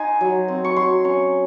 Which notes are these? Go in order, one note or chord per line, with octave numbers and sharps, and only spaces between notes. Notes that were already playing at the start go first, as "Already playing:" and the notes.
Already playing: D#4 G#5 C6
F#3
C4
C#6
F#3 C6
C#4 C#6